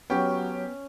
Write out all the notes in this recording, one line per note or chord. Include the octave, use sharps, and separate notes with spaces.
F#3 B3 C#4 G4 G5